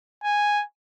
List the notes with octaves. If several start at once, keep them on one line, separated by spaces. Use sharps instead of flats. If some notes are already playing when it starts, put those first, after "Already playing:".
G#5